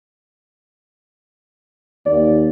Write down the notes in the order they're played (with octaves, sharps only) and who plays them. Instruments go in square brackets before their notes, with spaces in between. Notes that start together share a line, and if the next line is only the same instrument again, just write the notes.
[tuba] D#2 [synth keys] D5